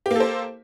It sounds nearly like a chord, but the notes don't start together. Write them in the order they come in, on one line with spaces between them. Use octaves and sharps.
G4 A#3 A4 C5